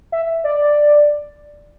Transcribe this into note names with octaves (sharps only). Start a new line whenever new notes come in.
E5
D5